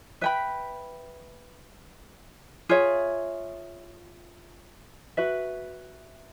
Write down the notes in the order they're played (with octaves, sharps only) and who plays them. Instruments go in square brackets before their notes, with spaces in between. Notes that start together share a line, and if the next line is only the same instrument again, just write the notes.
[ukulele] B4 E5 G5 B5
F4 G#4 C#5 E5
F#4 B4 E5